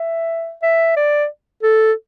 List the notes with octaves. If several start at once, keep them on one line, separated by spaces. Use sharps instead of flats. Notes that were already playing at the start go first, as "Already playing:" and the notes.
Already playing: E5
E5
D5
A4